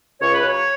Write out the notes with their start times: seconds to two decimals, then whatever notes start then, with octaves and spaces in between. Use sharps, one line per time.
0.21 C#2 C#5
0.34 B4
0.43 C#3 F#3 C#5